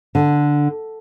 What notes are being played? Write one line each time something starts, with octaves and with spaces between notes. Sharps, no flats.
D3